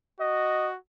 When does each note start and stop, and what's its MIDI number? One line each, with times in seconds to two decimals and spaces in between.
0.20 0.77 66
0.20 0.69 75